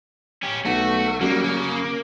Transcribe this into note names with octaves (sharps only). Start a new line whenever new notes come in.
C#4 G4
B1 A3 F#4
F#2 F#3 G3 A#3
C#3